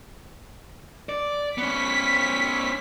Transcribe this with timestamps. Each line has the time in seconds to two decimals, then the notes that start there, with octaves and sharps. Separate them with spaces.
1.09 D5
1.58 B3 C#4 B6